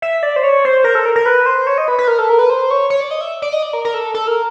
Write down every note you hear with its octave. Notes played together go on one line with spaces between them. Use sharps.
E5
D5
C5
C#5
C5
A#4
A4
A#4
A#4
B4
C5
C#5
D#5
B4
B4
A#4
A4
A#4
B4
C5
C#5
C#5
D5
D#5
E5
D5
D#5
D5
A#4
A#4
A4
A4
A#4